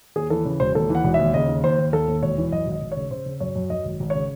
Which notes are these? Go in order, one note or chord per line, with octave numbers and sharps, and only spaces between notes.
D#2 G#4
E3 A4
C#3
E1 C5
D#2 A4
E3
F#5
E1
E5
D#2
C#3 D#5
D#2
D#2 C5
D#2
D#2 A4
D#2
E1 C#5
E3
F#2 D#5
G#1 D#5
G#1
C#3 C#5
C#3 C5
C#3
F#2 C#5
F#2
F#2 D#5
G#1
G#1
C#3 C#5